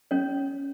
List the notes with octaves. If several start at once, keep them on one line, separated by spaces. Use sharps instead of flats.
C#4 C#5